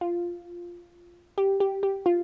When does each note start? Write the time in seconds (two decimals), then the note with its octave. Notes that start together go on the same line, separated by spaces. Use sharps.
0.01 F4
1.38 G4
1.60 G4
1.83 G4
2.06 F4